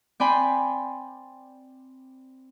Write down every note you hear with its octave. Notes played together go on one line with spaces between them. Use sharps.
C4 D5 G5 G#5 B5 C6